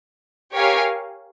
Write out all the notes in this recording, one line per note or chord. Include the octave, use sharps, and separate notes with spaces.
G4 A#4 C#5 F5 G#5